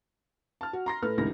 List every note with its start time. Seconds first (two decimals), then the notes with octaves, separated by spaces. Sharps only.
0.61 A5 F6
0.73 F#4
0.86 A#5 C6 A#6
1.02 A2 A4 B4 F6
1.18 F1 C#2 G#2 D#3 E4 A#6